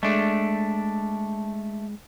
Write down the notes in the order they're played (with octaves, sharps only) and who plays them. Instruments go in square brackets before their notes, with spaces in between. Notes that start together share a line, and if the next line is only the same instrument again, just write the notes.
[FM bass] G#3 [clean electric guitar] A3 D4